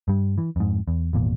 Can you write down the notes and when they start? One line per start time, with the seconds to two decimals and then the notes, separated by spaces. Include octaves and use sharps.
0.08 G2 G3
0.38 E3
0.56 F2 G#2
0.88 E2
1.13 G#1 E2 A#2